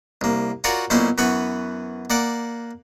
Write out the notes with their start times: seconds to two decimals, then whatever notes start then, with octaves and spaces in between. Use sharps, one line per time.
0.21 C2 A#3
0.64 F4 F#4 A#4 C#5 D5 F#5
0.90 B1 A#2 C#4 E4 C5
1.18 F#2 E3 B3 B5 C#6
2.10 A#3 D5 F#5 D6